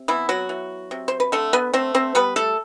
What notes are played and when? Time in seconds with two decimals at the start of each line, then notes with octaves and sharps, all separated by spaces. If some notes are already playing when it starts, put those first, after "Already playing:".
Already playing: C3
0.08 E3 B3 E4
0.29 F#3 F#4
0.49 E3
0.91 C3
1.08 C5
1.20 B4
1.32 D3 A3 A4
1.53 B3 B4
1.73 A3 C4 C5
1.95 C4 C5
2.15 G3 B3 B4
2.36 A3 A4